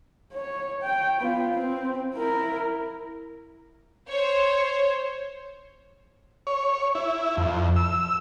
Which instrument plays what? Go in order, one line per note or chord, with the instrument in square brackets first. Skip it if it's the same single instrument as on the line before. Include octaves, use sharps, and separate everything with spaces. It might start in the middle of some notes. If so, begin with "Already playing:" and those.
[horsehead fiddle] C#5
C#5 G5
B3 F4
C4
E4 A#4
[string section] C5 C#5
[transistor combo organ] C#5
E4
F2
E6